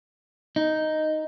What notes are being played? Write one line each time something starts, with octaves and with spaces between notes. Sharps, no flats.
D#4